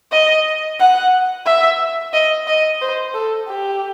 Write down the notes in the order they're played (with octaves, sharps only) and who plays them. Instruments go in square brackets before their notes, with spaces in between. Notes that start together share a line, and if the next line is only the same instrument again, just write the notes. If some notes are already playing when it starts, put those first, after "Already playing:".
[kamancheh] D#5
F#5
E5
D#5
D#5
C5
A4
G4